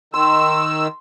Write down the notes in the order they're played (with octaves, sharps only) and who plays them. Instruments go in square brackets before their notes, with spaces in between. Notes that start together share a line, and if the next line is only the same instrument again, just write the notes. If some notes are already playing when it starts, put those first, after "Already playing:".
[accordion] D#3 E6 [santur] C6